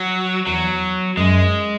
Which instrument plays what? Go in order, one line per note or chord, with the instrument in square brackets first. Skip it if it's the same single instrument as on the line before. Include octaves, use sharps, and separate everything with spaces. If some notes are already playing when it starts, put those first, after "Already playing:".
Already playing: [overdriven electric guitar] F#3
[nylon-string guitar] E2 [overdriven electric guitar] F#3
[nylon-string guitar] F#2 [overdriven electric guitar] G#3